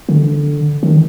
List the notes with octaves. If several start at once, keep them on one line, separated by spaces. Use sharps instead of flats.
D3
D#3